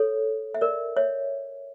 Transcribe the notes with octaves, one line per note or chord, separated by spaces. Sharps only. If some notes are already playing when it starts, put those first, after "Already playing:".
Already playing: A4 C#5
E5
A#4 D5
C#5 E5